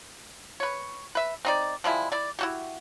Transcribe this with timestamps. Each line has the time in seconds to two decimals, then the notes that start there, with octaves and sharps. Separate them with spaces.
0.60 B4 C#5
1.15 B4 E5
1.45 C4 D#4 D5
1.84 F3 G3 G#3 E4
2.12 E4 D5
2.39 E4 F#4 G4